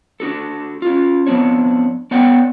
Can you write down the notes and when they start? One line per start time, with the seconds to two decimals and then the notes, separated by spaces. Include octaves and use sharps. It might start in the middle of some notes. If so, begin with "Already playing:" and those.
0.20 D4 F#4 A4
0.82 C#4 F4
1.27 F3 B3 C4 D4 C#5
2.11 B3 C#5 D5 F#5 G5